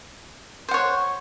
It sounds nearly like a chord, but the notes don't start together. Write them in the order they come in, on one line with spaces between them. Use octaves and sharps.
C5 F#5 C#5